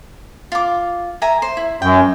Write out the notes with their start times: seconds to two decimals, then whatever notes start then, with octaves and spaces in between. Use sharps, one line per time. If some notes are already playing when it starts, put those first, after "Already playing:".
0.52 F4 D6
1.22 E5 G#5 A#5
1.42 C5
1.57 E4
1.82 F#2 G5